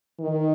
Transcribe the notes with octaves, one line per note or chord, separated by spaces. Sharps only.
D#3